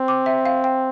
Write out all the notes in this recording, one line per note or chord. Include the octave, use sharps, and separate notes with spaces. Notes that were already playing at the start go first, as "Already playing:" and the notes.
Already playing: C4
D6
E5
F5
G5